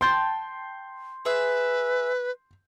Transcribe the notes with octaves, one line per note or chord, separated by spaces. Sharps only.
G5 A5 C6 G6
G#4 B4 E5